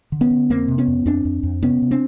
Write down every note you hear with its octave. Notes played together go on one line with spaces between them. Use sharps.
D3
B3 C#4
D3
F2 A#3 C4
C3
B3 C#4
F2
F2 C4 D4
F2
F2
C3 B3 C#4
C3
C4 D4